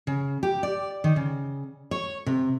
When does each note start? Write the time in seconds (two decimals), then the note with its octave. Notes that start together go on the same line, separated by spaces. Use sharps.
0.07 C#3
0.43 G4
0.63 D5
1.04 D#3
1.16 C#3
1.91 C#5
2.26 C3